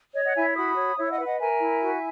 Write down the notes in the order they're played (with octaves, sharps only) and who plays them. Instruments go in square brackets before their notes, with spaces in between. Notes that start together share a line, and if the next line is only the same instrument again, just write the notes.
[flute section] C#5 D#5
D#5 F#5
E4 E5 G#5
F#4 B5 D#6
C#5
E4 C#5 E5
D#5 F#5
B4
D#5 F#5
A#4 E5 G#5
E4
F#4